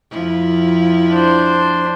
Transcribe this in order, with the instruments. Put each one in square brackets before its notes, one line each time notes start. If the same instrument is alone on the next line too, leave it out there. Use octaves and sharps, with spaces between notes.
[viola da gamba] F2 F3 E4
[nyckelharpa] D4 C5